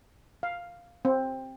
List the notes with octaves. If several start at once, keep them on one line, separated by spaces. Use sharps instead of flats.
F5
C4